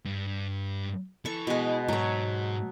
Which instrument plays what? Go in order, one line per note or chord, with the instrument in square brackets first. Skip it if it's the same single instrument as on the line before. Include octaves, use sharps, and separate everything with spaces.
[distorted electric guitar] G2
[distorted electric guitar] E4 G#5 [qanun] A4 C#6
[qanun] B2 G#3
[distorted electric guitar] G#2 [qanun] F#3 C#5